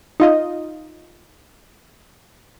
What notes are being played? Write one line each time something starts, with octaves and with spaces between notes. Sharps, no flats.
D#4 F4 D#5